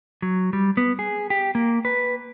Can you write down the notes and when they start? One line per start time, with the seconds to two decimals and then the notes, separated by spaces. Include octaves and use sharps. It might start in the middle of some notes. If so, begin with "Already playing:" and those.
0.22 F#3
0.53 G3
0.77 B3
0.99 G#4
1.30 G4
1.55 A#3
1.85 B4